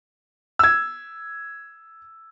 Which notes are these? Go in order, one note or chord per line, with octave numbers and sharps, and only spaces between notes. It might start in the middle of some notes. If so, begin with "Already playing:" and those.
E6 G#6